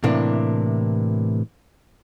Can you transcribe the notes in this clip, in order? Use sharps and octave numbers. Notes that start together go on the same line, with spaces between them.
A2 C3 E3 A#3 D4